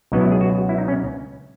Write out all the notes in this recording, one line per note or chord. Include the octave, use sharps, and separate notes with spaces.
C#2 B2 F#3 B3 D#4
E4
G#4
F#4
E4
D#4
C#4